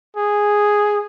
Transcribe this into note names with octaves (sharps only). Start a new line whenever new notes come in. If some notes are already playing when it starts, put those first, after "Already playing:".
G#4